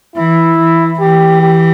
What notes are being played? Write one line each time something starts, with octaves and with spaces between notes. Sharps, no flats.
E3 E4
E3
E3 G4
G4